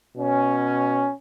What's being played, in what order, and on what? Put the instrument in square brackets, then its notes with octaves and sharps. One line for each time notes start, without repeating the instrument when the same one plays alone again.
[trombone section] B2 C#4